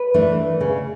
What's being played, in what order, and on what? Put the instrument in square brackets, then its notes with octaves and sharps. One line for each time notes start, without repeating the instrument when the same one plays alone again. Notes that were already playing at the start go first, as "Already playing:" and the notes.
Already playing: [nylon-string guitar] B4
E3 A3 D4
C#3